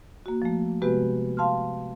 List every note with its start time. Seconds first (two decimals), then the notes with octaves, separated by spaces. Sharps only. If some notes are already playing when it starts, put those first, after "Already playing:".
0.26 A#3 F#4
0.42 F3 A3
0.82 C3 G#3 B3 F#4 G4 B4
1.37 F5 A5 C6 F6